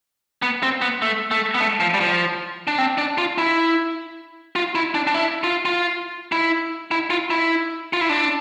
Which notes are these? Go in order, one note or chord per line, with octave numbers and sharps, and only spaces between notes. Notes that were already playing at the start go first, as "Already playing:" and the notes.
B3
C4
B3
A3
A3
B3
A3
F3
G3
F3
D4
C4
D4
F4
E4
F4
E4
D4
D4
E4
F4
F4
E4
E4
F4
E4
F4
E4
D4